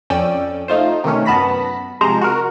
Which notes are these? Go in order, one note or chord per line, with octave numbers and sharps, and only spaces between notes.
F2 C#4 D5 G5 E6 D#7
A3 D#4 F4 C5
C3 D#3 A3 C#4
F#2 B3 A5 B5 A#6 B6
C3 F3 G#3 C5 A#5
F#4 A#4